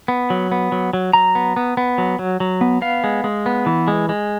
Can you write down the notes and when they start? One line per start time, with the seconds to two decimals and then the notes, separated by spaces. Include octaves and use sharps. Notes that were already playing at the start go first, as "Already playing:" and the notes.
0.08 B3
0.30 F#3
0.52 B3
0.72 F#3
0.93 F#3
1.13 F#3 A#5
1.35 B3
1.56 B3
1.77 B3
1.98 F#3
2.19 F#3
2.40 F#3
2.61 B3
2.82 B3 F5
3.04 G#3
3.24 G#3
3.46 B3
3.66 E3
3.88 G#3
4.09 G#3